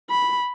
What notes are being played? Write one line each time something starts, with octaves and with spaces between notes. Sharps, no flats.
B5